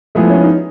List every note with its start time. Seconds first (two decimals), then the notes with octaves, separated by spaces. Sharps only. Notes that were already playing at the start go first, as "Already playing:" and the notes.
0.15 F3 G#3 A3 B3 E4 G#4
0.29 C#4
0.44 D#4